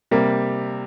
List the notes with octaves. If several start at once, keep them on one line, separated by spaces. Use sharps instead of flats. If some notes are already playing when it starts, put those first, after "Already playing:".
C3 G3 A#3